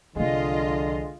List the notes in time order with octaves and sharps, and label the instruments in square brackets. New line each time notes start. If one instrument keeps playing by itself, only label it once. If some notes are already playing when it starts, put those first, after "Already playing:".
[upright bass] C2 F3 [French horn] D3 [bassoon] G#3 [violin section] F4 D#5